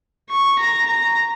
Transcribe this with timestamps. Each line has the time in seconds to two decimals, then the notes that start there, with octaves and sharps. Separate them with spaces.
0.30 C#6
0.58 A#5
0.86 A#5